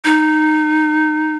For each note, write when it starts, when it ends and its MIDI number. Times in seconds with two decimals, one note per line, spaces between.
0.05 1.37 63